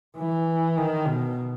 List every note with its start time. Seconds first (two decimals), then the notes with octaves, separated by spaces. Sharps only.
0.18 E3
0.77 D#3
1.07 B2